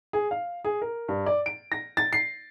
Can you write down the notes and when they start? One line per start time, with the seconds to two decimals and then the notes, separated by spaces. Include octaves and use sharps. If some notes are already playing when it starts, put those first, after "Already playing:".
0.13 G#4
0.31 F5
0.65 G#4
0.82 A#4
1.08 G2
1.26 D5
1.46 D7
1.72 A#6
1.97 A6
2.13 C7